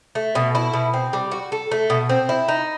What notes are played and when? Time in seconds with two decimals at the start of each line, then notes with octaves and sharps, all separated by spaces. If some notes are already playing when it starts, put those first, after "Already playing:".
0.15 A3
0.35 B2
0.55 E4
0.73 B2
0.94 C4
1.13 G3
1.31 F#4
1.52 A4
1.71 A3
1.90 B2
2.09 C4
2.29 E4
2.48 D#4